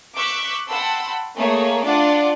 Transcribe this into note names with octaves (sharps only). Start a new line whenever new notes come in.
C#6 D6 E6 F#6 G6 B6
F#5 G5 A5 B5 C6 E6
A3 A#3 G#4 C#5
D4 F4 D5 F#5 D6